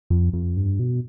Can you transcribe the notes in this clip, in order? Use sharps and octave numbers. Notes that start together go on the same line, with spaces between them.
F2
F2
G2
B2